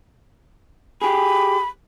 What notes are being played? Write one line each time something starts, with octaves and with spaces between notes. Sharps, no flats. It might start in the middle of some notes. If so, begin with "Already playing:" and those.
G4 G#4 B5